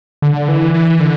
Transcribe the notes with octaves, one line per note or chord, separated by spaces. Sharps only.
D3
E3
E3
D3